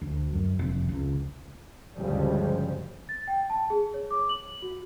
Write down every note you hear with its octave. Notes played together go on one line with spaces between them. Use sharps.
D2
F#2
F1
C#2
D2 G2 C#3 F3 G3 G#3
A6
G5
A5
G#4
C#5
D6
F#7
F#4